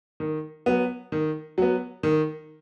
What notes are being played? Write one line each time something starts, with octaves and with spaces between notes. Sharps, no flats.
D#3
F#3 B3
D#3
F#3 B3
D#3